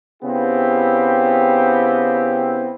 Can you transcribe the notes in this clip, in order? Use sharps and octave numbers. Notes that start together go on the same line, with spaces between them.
C#3 B3 C4 E4 G4